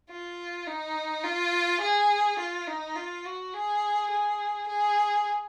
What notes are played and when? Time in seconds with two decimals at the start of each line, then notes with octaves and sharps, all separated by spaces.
0.10 F4
0.67 D#4
1.24 F4
1.81 G#4
2.39 F4
2.67 D#4
2.96 F4
3.25 F#4
3.54 G#4
4.11 G#4
4.68 G#4